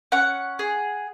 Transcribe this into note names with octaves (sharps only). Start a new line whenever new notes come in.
C#4 F#5
G#4